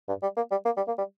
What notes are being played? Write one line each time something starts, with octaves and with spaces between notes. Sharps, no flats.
G2
G3
A#3
G3
A#3
G3
A#3
G3